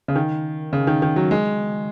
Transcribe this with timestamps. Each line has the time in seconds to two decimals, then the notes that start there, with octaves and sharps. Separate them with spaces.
0.08 C#3
0.15 D#3
0.73 C#3
0.87 D#3
1.02 D#3
1.16 F#3
1.31 G#3